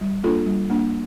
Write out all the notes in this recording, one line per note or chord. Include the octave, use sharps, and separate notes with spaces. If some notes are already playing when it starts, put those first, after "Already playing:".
G3
A#3 D4 F4 A4
G3
A#3 D4